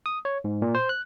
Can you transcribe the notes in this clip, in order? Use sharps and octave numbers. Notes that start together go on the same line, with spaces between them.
D#6
C#5
G#2
A#2
C5
F#6